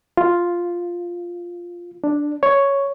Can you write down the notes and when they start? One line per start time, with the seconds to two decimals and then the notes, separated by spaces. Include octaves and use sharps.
0.17 F4
2.04 D4
2.43 C#5